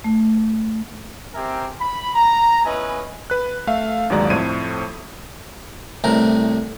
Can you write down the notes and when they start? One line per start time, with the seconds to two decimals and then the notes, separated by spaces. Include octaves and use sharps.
0.04 A3
1.35 C4 G4 A#4 E5 G#5
1.80 B5
2.15 A#5
2.64 B3 C#4 E4 B4 D#5 G#5
3.30 B4 F#6
3.67 A3 E5 F5
4.10 G1 D#2 F#3 G#3 D5 A#5
4.30 F2 A2 A3 C5 G#6 D#7
6.04 C2 A2 C3 A#4